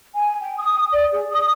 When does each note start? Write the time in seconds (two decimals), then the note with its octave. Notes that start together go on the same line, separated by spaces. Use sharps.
0.15 G#5
0.42 G5
0.58 D#6
0.93 D5
1.12 G#4
1.30 D#6